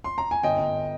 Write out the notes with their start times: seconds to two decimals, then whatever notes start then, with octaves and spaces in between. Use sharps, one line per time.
0.04 C6
0.18 A#5
0.31 G#5
0.43 G1 D#5 G5
0.59 G1